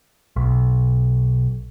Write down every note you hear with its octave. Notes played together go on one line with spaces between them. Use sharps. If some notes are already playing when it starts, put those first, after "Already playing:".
B1